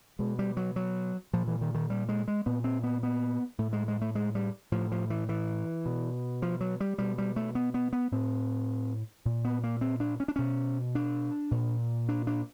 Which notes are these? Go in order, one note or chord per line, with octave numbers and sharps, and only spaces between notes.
B2 G#3
G3
F#3
F#3
A#2 F3
E3
D#3
D#3
G3
G#3
G#3
A#2 B3
C4
B3
B3
A2 A3
G#3
G#3
A3
G#3
G3
A2 F3
F3
E3
E3
B2
F3
F#3
G3
B2 G3
G3
A3
B3
B3
B3
A2 C4
A#2
B3
A#3
C4
D4
C#4
D4
B2 C#4
D4
A#2
D4
D4